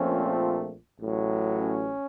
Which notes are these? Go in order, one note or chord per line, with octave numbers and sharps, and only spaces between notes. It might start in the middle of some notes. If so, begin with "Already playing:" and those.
Already playing: A#1 A#2 F3 A3 C4 C#4
A1 A2 F#3
C#4